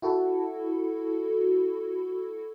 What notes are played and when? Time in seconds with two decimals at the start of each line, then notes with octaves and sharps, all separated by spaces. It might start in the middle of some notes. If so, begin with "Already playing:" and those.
0.02 E4 F#4 A4